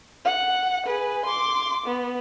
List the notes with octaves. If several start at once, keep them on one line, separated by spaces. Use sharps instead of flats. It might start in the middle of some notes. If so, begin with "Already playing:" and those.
F#5
G#4 B4
C6 D6
B3